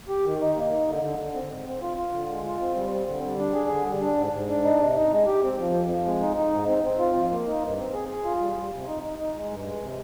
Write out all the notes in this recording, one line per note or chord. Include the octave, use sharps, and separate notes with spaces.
G4
D#3
D#4
A#3
D#4
D3
D3
D3
C4
G#2
C4
F4
F4
D3
G#3
F4
C4
G3
C4
D3
G3
D4
G#4
D3
G3
D4
G#2
G#2
D4
D#4
C3
D#4
G#3
G4
C4
F3
F2
F3
G#3
D#4
D#4
G#2
C4
C4
F4
F3
A#3
D#4
G2
C4
G#4
G#4
F4
G3
G3
C3
D#4
D#4
D#4
G#3
G2
G#3
C3